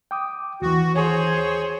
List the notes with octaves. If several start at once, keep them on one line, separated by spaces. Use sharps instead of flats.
G5 D6 D#6
D#2 E3 F#4
G#4 C5 C#5